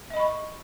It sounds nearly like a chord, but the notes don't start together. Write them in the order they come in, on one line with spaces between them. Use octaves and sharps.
E5 D#5 B5 C#6